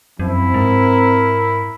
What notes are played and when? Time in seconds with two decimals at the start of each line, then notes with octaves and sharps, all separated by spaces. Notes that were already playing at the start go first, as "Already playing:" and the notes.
0.19 F#2 F3 C4 E4
0.54 G#2 A#4